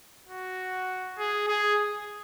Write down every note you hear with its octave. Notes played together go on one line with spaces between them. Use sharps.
F#4
G#4
G#4